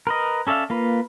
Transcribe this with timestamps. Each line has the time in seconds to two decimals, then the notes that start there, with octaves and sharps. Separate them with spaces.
0.07 A#4 B4 D#5
0.47 C#4 A4 D5 E5 F5
0.70 A#3 F4 B4